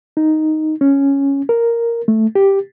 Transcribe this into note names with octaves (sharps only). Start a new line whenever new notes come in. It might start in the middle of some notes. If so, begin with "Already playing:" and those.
D#4
C#4
A#4
A3
G4